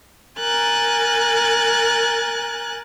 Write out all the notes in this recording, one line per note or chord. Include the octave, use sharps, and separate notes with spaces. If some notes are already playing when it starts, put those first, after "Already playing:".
A#4 G#5 F#6 A6